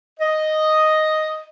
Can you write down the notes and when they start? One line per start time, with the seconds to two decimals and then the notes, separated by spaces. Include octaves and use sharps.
0.20 D#5